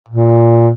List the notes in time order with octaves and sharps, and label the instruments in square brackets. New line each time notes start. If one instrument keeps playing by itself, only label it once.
[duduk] A#2